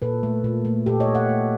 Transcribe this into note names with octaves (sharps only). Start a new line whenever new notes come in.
A#2 A4 B4
A3
A#2
A3
A#2 G4 A4
C#5 D#5
A3
E5 F#5
A3